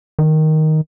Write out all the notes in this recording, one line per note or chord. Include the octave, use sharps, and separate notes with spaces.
D#3